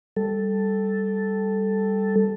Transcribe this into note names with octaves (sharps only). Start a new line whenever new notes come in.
G3 A4